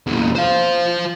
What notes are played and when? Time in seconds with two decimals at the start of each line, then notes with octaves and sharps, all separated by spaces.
0.07 E2 A#2
0.35 C5 F5